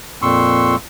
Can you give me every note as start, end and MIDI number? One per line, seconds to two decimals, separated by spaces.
0.22 0.76 41
0.22 0.76 46
0.22 0.76 84
0.22 0.76 85
0.22 0.76 88